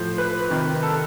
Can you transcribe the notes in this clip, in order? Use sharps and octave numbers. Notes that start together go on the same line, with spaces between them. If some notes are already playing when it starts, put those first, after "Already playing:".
Already playing: A2 F3 C5
B4
C3 D#3
A4